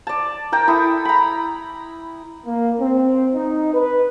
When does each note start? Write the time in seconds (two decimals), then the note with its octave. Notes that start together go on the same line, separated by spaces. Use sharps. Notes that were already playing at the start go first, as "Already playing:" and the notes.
0.07 D5 A5
0.52 A#4 G5 A#5
0.67 E4 A4 D#6
1.05 A#5 B5
2.46 A#3
2.80 C4
3.34 D#4
3.74 B4